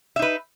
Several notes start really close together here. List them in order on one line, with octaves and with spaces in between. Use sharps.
E5 D#4 B4